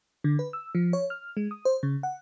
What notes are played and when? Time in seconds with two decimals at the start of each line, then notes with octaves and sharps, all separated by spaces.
0.24 D3
0.39 B4
0.53 E6
0.75 F3
0.93 C#5
1.10 F6
1.37 G#3
1.51 D#6
1.65 C5
1.83 C#3
2.03 F#5